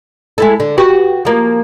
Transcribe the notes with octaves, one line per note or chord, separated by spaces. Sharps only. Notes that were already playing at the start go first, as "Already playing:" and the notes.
G#3 E4 A4
D3
F#4 G4 B4
F3 A#3